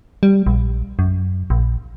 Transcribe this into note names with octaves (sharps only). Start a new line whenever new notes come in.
G3
A#1
F#2
A#1